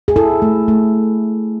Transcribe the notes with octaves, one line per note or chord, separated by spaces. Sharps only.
G#4
E4 A4
A3
A3